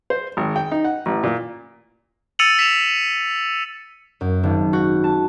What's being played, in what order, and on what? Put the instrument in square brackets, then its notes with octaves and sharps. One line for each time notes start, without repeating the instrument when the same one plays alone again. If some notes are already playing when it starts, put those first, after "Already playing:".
[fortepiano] C5
G#1
G5
D#4
F#5
A1
A#2
[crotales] E6 A6 C#7 D#7 F7 F#7
B6 E7 F7
[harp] F#2
G#1
F#4
A5